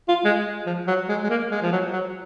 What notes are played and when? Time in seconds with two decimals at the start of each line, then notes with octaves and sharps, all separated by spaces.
0.09 F4
0.25 G#3
0.67 F3
0.87 F#3
1.09 G#3
1.24 G#3
1.30 A#3
1.51 G#3
1.62 F3
1.72 F#3
1.93 F#3